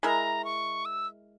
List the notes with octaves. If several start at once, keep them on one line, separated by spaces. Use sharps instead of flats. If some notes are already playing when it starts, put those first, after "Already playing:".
G#3 E4 A#4 A#5
C#6
E6